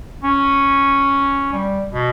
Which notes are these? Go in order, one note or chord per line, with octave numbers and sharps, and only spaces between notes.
C#4
G3
B2